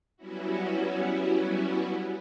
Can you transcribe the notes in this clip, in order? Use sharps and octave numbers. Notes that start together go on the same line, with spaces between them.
F#3 G3 B3 C#4 E4 F#4